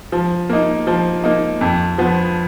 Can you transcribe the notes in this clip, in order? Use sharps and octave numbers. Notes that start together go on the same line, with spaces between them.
F3
A#3 D#4
F3
A#3 D#4
F2
F3 B3